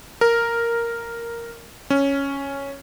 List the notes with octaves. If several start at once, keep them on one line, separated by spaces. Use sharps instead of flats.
A#4
C#4